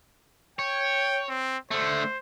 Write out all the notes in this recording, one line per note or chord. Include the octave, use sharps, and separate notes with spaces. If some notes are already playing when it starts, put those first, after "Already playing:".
C#5 G5
C4
D3 A3 C5